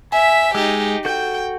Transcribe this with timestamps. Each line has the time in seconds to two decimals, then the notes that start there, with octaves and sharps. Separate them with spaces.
0.12 E5 G#5 B6
0.55 G#3 D#4 G4 E6
1.05 F#4 A4 G5 G6